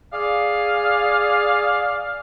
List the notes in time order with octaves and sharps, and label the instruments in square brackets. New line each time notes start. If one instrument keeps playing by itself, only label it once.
[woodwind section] G#4 D5 F5